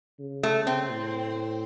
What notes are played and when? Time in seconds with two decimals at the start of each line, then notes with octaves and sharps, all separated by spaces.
0.19 C#3
0.43 A3
0.67 C4
0.91 A2